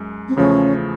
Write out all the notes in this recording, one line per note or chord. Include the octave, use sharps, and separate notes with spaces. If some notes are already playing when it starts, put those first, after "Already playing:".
Already playing: F#2 G#3
C4
E2 C#3 F3 A3 C#4